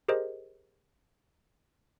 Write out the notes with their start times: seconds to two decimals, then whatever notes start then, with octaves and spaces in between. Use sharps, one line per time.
0.08 G4 G#4 A#4 C5 D#5